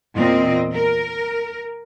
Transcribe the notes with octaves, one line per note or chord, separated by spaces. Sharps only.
E2 A#2 C4 D#5
A#4